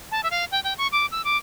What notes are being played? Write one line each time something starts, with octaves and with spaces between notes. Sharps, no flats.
A5
E5
F5
G5
G5
C#6
D6
E6
D6